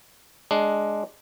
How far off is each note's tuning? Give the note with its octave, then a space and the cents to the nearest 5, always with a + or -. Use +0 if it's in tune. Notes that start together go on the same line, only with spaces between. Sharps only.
G#3 +5 D4 +0